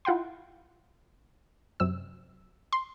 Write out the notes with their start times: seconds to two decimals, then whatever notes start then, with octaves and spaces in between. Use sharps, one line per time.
0.05 E4 F4 F#5 G5 C6
1.80 F#2 C3 E6
2.73 C6